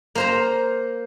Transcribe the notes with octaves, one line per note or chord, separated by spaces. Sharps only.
A#3 C5 A#5